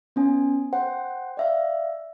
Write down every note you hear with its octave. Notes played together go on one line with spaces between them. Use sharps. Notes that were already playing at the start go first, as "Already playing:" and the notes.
B3 C#4 G#5
C5 F#5 G5
D5 E5 F5